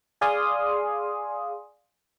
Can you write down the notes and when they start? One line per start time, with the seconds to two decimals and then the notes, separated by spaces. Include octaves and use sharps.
0.21 G#4 D5 F5 G#5 C6 D#6